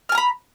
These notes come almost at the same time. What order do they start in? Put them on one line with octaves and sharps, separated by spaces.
F6 G#5 A#5 B5